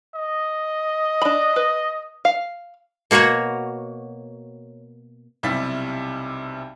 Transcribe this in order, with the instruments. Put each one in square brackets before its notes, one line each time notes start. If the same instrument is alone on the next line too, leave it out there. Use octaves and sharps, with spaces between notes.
[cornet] D#5
[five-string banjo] D4 B5
B4
F5
[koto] B2 A#3 F#4 A#4 C#5
[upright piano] B1 C3 G3 E4 A6 B6